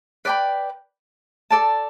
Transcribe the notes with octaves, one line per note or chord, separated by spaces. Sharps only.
B4 D5 G5 B5
A4 D5 A5